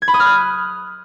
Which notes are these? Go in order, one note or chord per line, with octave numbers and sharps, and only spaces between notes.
G#6
B5
D#6
F6
F#6